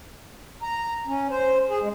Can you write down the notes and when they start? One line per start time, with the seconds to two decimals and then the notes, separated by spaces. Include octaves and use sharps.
0.63 A#5
1.07 C#4
1.30 C5
1.68 G#4
1.81 G#3